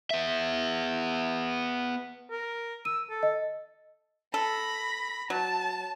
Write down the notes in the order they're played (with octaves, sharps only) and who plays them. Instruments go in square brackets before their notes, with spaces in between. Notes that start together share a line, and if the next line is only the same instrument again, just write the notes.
[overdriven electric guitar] B3 E5
[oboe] A#4
[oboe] E6 [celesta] D#7
[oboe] A4
[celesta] D#5
[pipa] A4 [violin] B5 A#6
[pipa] F#3 [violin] A5